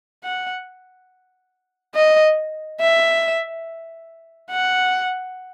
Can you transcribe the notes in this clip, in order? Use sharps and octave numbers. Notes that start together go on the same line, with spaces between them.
F#5
D#5
E5
F#5